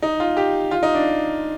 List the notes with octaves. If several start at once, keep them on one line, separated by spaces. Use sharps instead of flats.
D#4
F4
G4
F4
D#4
D4